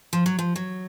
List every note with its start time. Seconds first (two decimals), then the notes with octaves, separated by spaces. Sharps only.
0.13 F3
0.26 F#3
0.39 F3
0.56 F#3